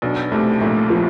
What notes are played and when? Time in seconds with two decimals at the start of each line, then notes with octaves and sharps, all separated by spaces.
0.02 B1 B2 D4
0.32 C2 C3 A3
0.61 A#1 A#2 A3
0.90 F3